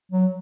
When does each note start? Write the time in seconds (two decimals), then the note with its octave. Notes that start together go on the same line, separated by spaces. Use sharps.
0.12 F#3